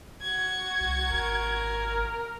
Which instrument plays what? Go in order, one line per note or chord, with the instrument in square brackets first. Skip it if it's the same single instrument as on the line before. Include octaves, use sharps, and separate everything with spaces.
[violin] F#4 G#6
[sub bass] C2
[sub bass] G#1 [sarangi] A#4